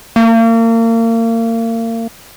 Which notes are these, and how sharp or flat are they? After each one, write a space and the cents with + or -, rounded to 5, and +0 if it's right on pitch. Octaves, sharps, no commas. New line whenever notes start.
A#3 -35